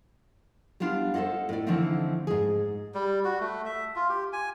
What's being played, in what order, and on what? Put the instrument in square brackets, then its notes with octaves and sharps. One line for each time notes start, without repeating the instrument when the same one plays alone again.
[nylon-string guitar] G3 B3 D4 F4
A4 C5 D5 D#5 F#5
A2 D5
D3 E3 F3 A3 C4 D#4
G#2 G#4
[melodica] G3
F#4
A3
E5
F4
G4
G#5